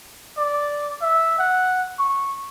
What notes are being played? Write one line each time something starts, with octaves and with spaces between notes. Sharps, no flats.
D5
E5
F#5
C#6